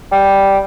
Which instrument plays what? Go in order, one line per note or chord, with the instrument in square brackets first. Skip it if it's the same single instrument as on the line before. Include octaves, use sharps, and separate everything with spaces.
[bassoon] G3